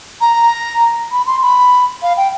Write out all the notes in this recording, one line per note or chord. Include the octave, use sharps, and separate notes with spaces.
A#5
B5
C6
B5
F5
G5